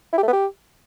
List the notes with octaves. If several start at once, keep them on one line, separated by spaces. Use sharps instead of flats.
E4
G4
A3
B3
G4